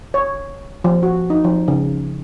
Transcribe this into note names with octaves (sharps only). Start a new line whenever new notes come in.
C#5
F3
F#4
D#4
F3
C#3